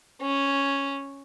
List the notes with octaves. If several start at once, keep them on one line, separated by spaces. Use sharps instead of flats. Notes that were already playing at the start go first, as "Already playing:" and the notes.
C#4